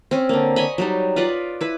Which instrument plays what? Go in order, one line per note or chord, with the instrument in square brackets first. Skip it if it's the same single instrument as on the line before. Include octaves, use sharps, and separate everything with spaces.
[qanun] C4 C#4
D3 A#3
C#5 D#5 G#5 B5
F#3 G3 D#4
F4 B4 D5 D#5
E4 B4